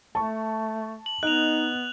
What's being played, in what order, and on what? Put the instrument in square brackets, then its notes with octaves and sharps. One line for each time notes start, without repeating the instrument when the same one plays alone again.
[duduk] A3 [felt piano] A5 C#6
[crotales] F#7
[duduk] B3 [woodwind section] D#4 [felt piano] D#5 [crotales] F#6 F7